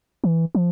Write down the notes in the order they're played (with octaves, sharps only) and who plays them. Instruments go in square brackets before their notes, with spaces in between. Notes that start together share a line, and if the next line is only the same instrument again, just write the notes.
[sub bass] E3
F3